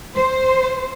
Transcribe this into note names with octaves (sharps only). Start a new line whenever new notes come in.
C5